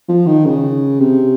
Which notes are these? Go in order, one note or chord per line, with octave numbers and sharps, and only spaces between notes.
F3
D#3
C#3
C3